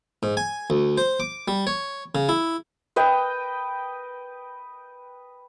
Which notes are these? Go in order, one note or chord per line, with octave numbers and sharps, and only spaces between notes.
G#2
G#5
D2
C5
D6
G3
C#5
C#3
E4
B4 D#5 G5